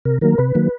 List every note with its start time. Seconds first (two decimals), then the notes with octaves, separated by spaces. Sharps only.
0.05 C3 A#4
0.21 D#3 F#3 A#3 A#4
0.38 C3 B4
0.55 D#3 F#3 A#3